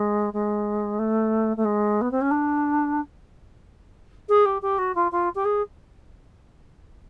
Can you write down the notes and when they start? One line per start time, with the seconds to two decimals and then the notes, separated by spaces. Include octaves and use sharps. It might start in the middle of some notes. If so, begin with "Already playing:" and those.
Already playing: G#3
0.33 G#3
0.99 A3
1.57 A3
1.65 G#3
2.01 B3
2.11 C4
2.21 C#4
2.31 D4
4.28 G#4
4.45 G4
4.62 G4
4.78 F#4
4.95 F4
5.11 F4
5.35 G4
5.44 G#4